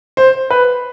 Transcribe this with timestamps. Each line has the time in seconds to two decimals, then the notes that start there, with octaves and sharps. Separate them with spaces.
0.17 C5
0.50 B4